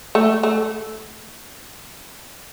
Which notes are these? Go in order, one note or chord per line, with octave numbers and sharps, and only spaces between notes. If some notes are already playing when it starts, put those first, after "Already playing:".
A3
A3